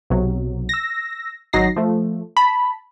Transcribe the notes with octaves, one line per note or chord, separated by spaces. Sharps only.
B1 C3 F#3
E6 A#6
G#1 F#3 D#4 A#6 C7
F3 A3
A5 B5